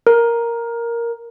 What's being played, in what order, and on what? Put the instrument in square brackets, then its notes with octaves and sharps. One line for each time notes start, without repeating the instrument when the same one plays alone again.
[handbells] A#4